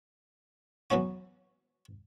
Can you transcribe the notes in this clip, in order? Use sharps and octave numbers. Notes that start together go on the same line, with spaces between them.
E3 F#3 B3 C#4 F#4